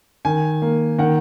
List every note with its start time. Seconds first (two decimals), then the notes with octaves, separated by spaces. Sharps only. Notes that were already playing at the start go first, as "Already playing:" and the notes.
0.25 D#3 G#5
0.62 A#3
0.98 D#3 F#5